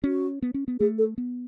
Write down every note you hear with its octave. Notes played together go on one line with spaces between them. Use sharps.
C#4 F#4
B3
C#4
B3
A3 G#4
A4
B3